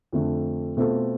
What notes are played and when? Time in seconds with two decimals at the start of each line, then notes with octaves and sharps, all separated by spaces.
0.13 F2 D3 A3
0.77 B2 A3 C4 F4 A4